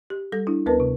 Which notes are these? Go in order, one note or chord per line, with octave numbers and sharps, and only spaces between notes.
G4
G3 A4 A#6
D4 E4
D2 B3 A#4 B4 A5
C3